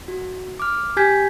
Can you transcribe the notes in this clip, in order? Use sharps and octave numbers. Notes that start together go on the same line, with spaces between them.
F#4
D6 F6
G4 G#5 G6 G#6 B6